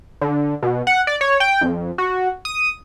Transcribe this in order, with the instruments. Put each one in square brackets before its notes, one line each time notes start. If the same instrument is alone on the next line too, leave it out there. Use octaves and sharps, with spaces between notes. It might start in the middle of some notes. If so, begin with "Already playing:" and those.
[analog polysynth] D3
B2
F#5
D5
C#5
G5
F2
F#4
D#6